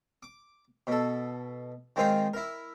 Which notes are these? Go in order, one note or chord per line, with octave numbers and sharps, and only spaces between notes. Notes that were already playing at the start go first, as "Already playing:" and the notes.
D6
B2 A4
D#3 G#3 C4 D#4 F4 G5
E4 A#4